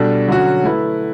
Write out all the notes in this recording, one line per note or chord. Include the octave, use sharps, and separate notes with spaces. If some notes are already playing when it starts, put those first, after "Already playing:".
Already playing: B2 G3 D4 A4
D3 F#3 C#4 F#4
A3 E4 B4